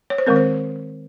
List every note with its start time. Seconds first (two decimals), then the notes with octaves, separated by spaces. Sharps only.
0.10 C#5
0.18 C5
0.27 D#3 G#3 C4 A#4
0.36 C5